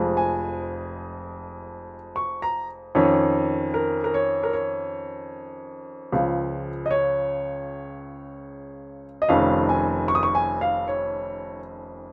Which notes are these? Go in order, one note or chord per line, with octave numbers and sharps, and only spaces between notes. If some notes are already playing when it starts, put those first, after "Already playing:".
Already playing: F1 F2 F3 G#3
G#5
C#6
A#5
F2 D#3 C#4 C#5
A#4
A#4
C#5
A#4
C#5
C#2 C#3 F3
D#5
C#5
D#5
F1 F2 D#3 C#4 F5
G#5
C#6
D#6
C#6
G#5
F5
C#5